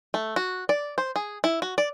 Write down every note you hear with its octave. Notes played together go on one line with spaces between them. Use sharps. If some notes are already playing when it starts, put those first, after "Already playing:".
A3
F#4
D5
C5
G#4
E4
F#4
D5